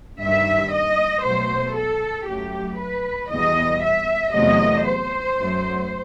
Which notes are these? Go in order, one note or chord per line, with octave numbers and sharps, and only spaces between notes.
G2 D#3 G3 E5
D#5
B2 F#3 A3 C5
A4
F#2 F#3 A3 G4
B4
E2 B2 G3 D#5
E5
E2 C3 F#3 A3 D#5
C5
F#2 F#3 A3